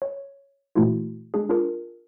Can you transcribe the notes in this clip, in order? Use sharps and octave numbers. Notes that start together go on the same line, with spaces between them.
C#5
A#2 E3 A3 E4 F#4
G#3 D4 G#4
D4 F4 G#4 A#4